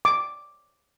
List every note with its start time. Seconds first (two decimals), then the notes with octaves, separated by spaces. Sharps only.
0.05 D6